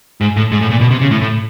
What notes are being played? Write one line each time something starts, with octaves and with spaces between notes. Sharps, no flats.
G#2
A2
G#2
A2
A#2
B2
C3
C#3
A2
A2